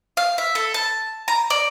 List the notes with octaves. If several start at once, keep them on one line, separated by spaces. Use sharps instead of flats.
F5
E5
A4
A5
A#5
D5